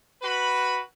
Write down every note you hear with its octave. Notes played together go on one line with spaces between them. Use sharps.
F#4 B4 B5